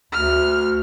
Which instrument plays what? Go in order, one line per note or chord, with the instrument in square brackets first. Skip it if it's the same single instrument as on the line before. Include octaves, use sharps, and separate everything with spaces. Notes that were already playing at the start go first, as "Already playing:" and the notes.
[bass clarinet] D2 [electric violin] F6